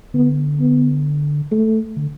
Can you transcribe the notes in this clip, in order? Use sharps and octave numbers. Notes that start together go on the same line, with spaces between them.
D3 B3
B3
A3
D3